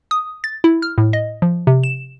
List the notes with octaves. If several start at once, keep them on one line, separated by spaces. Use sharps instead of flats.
D#6
A6
E4
F6
A2
D#5
F3
C3
E7